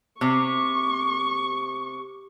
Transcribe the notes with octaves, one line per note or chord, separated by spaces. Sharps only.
C3 C#6